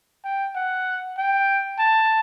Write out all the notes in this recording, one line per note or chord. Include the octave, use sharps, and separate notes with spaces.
G5
F#5
G5
A5